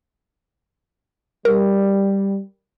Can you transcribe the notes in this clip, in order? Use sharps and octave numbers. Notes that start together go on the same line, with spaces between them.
G3 A#4